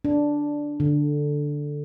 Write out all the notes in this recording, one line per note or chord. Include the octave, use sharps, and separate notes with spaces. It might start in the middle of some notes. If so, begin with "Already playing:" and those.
D4
D3